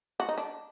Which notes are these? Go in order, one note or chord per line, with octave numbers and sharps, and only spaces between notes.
F#4
D#4
D4